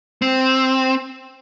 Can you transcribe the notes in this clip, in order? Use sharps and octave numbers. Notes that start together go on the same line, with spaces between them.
C4